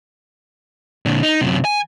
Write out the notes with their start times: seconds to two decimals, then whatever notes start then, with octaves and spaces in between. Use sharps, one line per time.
1.06 A#2 D3
1.23 D#4
1.41 F#2 C3
1.65 G#5